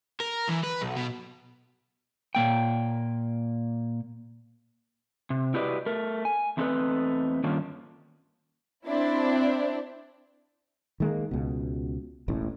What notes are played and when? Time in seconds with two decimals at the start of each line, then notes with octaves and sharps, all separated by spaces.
0.21 A#4
0.49 E3
0.64 B4
0.82 B1
0.97 B2
2.35 A#2 A#3 G5
5.30 C3
5.54 E4 F#4 G4 B4 D5 D#5
5.86 A3 A#4
6.25 G#5
6.57 E2 A3 C4 D#4 A4 B4
7.44 G2 D#3 A#3 C#4 D4 F4
8.87 C4 D4 E4
11.00 D#3 G#3 A#3
11.31 C#2 B2
12.28 E1 A1 A2